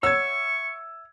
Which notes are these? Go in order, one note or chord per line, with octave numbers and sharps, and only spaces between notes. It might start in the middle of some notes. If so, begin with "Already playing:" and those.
C#5 E5 F#5 C#6 E6 G#6